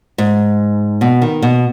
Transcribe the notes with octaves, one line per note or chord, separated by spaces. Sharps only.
G#2
B2
D#3
B2